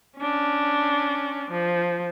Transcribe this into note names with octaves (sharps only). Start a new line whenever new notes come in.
C#4 D4
F3